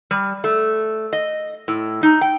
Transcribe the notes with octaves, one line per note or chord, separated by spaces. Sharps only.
G3
A3
D#5
A2
D#4
G5